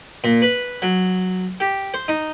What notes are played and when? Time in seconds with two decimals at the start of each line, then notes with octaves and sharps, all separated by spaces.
0.24 A#2
0.42 B4
0.82 F#3
1.60 G4
1.94 C5
2.08 D#4